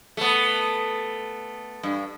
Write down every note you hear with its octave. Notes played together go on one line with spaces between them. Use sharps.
A3 B3
G2